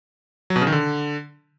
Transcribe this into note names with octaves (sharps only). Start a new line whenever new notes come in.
F#3
B2
C#3
D#3
D3